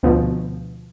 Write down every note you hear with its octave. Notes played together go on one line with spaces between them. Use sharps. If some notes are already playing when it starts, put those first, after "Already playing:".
D2 B2 F3